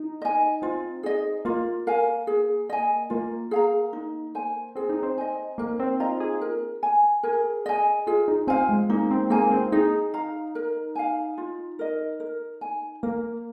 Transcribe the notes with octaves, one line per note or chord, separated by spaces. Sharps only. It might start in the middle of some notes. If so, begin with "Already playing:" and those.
Already playing: D#4
D#5 G#5
C4 F4
G#4 D#5
A#3 F4
A#4 F5 G#5
G#4
D#5 G#5
A#3 F4
G#4 F5 A#5
D#4
C5 G#5
C4 G#4
D#4
C4
D#5 G#5
A#3 A#4
C4
F4 D#5 A#5
G#4
A#4
G#5
G#4 A#4
D#5 G#5
F4 G#4
D#4
C4 C5 F5 G#5
G#3
A#3 D#4
C4
A#3 G#4 C5 G#5
C4
D#4 G#4
F5 A#5
A#4
F5 G#5
F4
A#4 D#5
A#4
G#5
A#3 A#4